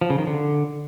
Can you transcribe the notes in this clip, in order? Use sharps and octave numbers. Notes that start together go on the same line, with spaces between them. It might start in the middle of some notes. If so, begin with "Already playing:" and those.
F3
C#3
D#3
D3